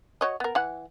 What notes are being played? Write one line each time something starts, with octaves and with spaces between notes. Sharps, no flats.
F#4 C#5 D#5
B3 A#4
E3 F#5